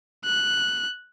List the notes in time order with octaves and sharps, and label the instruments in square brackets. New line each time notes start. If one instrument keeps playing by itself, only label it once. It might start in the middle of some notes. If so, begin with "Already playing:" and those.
[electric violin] F#6